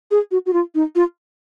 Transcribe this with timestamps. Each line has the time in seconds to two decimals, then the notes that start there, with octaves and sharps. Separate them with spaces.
0.11 G#4
0.31 F#4
0.46 F#4
0.53 F4
0.75 D#4
0.95 F4